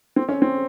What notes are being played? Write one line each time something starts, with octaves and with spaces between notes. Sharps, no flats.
C4
C#4
C4